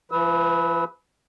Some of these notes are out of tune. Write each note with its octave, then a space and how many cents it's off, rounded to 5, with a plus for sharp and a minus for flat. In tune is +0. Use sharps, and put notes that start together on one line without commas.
F3 -45 B4 +0 E6 -35